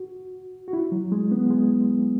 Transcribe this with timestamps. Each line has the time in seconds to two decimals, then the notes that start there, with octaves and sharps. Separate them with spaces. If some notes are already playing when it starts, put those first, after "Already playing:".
Already playing: F#4
0.68 F#4
0.73 E4
0.92 F#3
1.12 G#3
1.31 B3
1.50 G#3